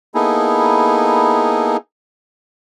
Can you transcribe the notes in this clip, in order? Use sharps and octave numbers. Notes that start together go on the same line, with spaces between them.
A#3 B3 D#4 E4 G#4 A4